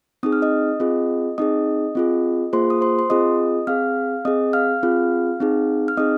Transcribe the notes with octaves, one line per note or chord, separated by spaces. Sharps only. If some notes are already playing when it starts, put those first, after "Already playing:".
C4 D#4 G#4 D#6
F6
D#5 D#6
C4 F4 G#4
C4 D#4 G#4 D#5 D#6
C4 F4 G#4
A#3 F4 G#4 C5 C6
D#6
C5 C6
C6
C4 F4 G#4 D#5 D#6
C4 G#4 F5 F6
C4 G#4 D#5 D#6
F5 F6
C4 F4 G#4
C4 D#4 G#4
F6
C4 D#4 G#4 D#5 D#6